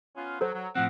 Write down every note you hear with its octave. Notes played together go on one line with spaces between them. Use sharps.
B3 C#4 F4
F#3 A4 C5
F#3
A2 F3 C4 F#5